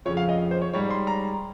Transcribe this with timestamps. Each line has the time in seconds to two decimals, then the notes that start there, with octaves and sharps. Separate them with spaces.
0.05 F2 C#3 F3 C#5
0.17 F5
0.29 D#5
0.51 C5
0.62 C#5
0.73 G#2 G3 C#5
0.90 C6
1.07 A#5